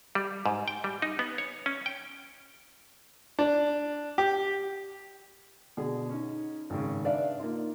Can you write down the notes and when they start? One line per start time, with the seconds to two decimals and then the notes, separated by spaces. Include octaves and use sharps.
0.15 G3
0.46 G#2
0.68 G5
0.84 G3
1.02 D#4
1.19 B3
1.38 C#5
1.66 C#4
1.86 G5
3.39 D4
4.18 G4
5.77 B2 D3 G#4
6.09 C#4 D#4
6.70 G#1 C#3
7.04 D4 B4 D5 E5 F5
7.40 A#3 D#4 F4